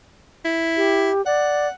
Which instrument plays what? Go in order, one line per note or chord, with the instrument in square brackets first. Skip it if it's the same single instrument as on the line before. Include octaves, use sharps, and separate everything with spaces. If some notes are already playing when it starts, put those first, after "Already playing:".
[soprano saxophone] E4
[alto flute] G4
[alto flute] D5 [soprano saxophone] F#5